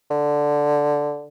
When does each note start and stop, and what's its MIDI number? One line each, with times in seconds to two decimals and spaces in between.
0.10 1.27 50